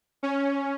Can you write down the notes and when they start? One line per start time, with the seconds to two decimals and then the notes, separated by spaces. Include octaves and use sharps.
0.23 C#4